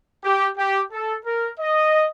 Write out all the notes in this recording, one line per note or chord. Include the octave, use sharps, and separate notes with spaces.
G4
G4
A4
A#4
D#5